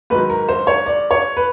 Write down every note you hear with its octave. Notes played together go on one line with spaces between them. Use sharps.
G#2 D#3 F#3 B4
A#4
C5
C#5
D5
C#5
B4